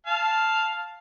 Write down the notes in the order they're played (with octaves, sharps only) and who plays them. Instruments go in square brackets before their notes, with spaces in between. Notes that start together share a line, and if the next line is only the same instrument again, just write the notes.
[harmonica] F5 A5